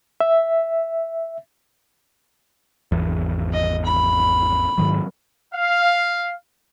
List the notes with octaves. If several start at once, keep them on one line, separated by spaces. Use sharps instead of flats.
E5
G#1 E2
D#5
B5
G#2 D#3 F#3
F5